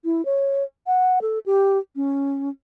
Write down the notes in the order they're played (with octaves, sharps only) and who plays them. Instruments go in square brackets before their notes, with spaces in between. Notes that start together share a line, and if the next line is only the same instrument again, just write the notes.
[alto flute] E4
C#5
F#5
A4
G4
C#4